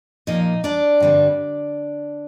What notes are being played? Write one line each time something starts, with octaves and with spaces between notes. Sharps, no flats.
A#2 F3 A#3 D#4 D#5
D4 D5
G2 D3 G3 C4